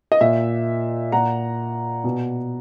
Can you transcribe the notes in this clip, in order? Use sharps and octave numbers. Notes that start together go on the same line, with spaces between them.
D#5
A#2 E5
A#2 F#5 A#5
B2